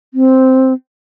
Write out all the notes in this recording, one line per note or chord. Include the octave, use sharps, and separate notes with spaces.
C4